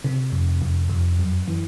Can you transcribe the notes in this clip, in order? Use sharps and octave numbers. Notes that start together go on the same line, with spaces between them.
C3
F2
F2
F2
F#2
E3